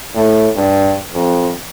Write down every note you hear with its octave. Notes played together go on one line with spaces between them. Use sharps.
A2
G2
F2